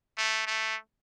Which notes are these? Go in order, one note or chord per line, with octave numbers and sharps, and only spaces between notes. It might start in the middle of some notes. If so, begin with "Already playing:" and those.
A3
A3